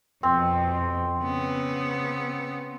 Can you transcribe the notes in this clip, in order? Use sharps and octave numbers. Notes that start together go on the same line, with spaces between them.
F2 B2 C4
C#3 B3